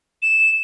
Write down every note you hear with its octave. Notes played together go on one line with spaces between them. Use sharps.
E7